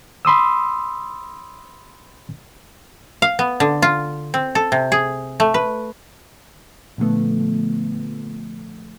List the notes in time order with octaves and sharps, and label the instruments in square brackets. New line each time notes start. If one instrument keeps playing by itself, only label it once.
[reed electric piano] B5 C6 D#6 E6
[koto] F5
B3
D3
F4
C4
A4
C3
G#4
A3
B4
[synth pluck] A#2 D3 F3 A3 B3